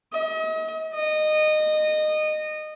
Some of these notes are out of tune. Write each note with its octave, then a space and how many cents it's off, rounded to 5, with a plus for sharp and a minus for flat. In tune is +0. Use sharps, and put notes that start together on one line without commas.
D#5 +40
D#5 -20